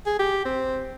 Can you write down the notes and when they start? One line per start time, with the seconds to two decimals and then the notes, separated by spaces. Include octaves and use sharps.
0.06 G#4
0.19 G4
0.45 C4